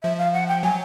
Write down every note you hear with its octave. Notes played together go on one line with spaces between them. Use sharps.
F3 E5
F5
F#5
G5
F#3 G#5